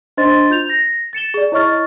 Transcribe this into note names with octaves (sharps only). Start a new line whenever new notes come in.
D4 C5 D#5 C6 A6
F4 G6 F7
A#6
A6 C#7 E7 G7
G#4 D5
E4 C#5 D#5 C#6 F6 A6